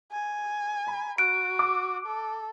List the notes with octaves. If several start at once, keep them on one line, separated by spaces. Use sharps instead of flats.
G#5
A#5 B5
F#4 F#6 D7
D6 E6
A4